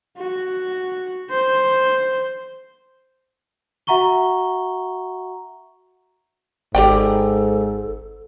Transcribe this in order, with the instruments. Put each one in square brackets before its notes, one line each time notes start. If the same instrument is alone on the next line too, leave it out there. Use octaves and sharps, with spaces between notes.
[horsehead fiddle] F#4
C5
[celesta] F#4 E5 F#5 A#5 C#6 G7
[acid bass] G#1 [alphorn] G#2 [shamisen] G4 D5 G5 [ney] A4